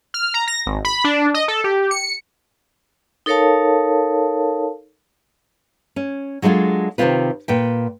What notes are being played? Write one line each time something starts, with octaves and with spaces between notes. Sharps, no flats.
F6
A#5
A#6
G#1
B5
D4
D#5
A4
G4
C#7
D#4 A4 A#4 C#5 F5 A5
C#4
F#3 G#3 D4 E4 F4 A4
C3 D#3 E3 C4 F4 B4
A#2 B4 G5